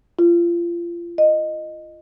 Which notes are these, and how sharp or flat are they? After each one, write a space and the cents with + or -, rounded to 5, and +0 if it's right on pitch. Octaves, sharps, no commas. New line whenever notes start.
F4 -30
D#5 -10